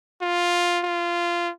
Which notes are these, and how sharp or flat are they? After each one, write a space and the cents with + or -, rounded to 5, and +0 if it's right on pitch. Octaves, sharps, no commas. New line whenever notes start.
F4 +5
F4 -15